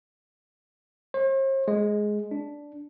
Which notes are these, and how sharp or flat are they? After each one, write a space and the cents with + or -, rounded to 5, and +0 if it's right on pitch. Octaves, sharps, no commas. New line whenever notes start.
C5 +45
G#3 +10
D4 -5